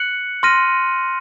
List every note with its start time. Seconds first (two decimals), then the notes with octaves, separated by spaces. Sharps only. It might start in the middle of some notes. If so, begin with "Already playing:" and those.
Already playing: F#6 C#7 F#7
0.43 C6 F6 A#6 D#7